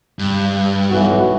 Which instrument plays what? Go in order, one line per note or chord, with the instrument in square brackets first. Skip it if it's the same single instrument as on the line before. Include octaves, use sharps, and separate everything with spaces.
[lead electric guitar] G2
[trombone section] B1 E3 F#4